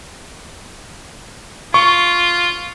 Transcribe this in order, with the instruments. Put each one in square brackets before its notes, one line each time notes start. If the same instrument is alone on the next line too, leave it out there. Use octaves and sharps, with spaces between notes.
[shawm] F4 [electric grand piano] C#6